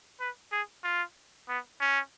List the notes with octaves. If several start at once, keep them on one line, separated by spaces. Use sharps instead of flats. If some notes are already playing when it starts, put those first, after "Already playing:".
B4
G#4
F4
B3
C#4